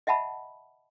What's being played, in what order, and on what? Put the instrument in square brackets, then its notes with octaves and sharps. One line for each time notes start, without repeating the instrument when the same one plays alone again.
[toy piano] D#5 E5 F#5 A5 B5